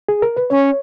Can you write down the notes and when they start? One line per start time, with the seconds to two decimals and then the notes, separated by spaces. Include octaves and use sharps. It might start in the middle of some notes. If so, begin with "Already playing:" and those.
0.09 G#4
0.22 A#4
0.37 B4
0.50 C#4 C#5